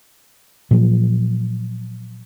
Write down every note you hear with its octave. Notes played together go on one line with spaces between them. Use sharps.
A#2 F3 F#3